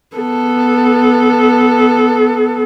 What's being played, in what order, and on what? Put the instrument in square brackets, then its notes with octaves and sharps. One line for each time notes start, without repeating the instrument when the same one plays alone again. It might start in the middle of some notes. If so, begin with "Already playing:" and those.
[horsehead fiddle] B3 A4